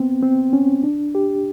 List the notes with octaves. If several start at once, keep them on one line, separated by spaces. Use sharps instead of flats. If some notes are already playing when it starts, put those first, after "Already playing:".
Already playing: B3 C4
C4
C#4
D4
G4